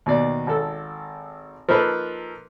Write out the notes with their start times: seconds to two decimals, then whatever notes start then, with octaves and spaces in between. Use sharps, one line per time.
0.06 D#2 B2 D5
0.47 G#1 A4
1.69 F3 A#3 D#4 A4 B4